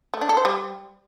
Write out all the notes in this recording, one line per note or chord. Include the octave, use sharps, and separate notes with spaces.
A3
D4
A4
C5
G3